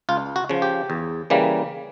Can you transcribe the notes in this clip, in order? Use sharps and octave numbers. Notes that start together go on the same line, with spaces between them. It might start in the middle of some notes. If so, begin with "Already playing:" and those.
C#2 F4
F#4
C#3 F3
G4
E2
C#3 E3 G3 A#3